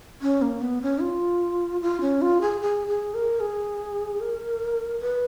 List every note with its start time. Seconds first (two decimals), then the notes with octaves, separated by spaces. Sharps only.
0.22 C#4
0.42 A#3
0.61 B3
0.82 C#4
1.01 F4
1.81 F4
2.01 C#4
2.22 F4
2.41 G#4
2.61 G#4
2.88 G#4
3.14 A#4
3.40 G#4
4.20 A#4
4.99 B4